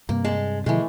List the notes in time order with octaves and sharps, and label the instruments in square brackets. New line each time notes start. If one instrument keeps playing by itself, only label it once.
[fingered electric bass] G2 C3 [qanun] A#3
[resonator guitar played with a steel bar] G#3 [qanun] A5
[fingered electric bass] B2 D3 F3 [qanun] E3 A3 [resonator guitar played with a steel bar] G#3